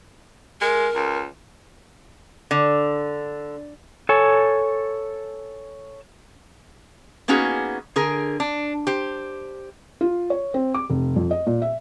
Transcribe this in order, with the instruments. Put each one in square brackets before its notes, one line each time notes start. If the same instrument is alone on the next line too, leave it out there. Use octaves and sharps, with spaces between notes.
[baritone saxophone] G#3 [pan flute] A#4
[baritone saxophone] C#2
[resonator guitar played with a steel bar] D3
[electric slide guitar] A4 C#5 G#5
[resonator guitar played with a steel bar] A#3 B3 C#4 D#4 F#4 G#4
D3 G#4 A#4
D4
G4 C5
[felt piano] F4
C#5
C4
D6
F1
F2
D#5
A#2
E5